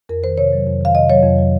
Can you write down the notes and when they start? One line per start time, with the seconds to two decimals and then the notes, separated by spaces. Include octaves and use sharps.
0.09 F2 A#4
0.23 D#3 C5
0.38 C3 C#5
0.53 F#3
0.67 F2
0.81 D#3 F5
0.95 C3 D#5
1.10 F#3 C#5
1.23 F2
1.39 F#3